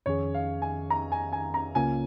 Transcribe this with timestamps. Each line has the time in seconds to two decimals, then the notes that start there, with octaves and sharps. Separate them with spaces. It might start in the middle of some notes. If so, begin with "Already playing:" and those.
0.06 F2 D#3 C#4 G#4 C#5
0.34 F5
0.62 G#5
0.90 A#5
1.12 G#5
1.33 G#5
1.54 A#5
1.75 C#2 C#3 A#3 C#4 F4 G#5